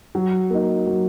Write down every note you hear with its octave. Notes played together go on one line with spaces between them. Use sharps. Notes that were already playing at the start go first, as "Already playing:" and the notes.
F#3
A#3 D#4
F#3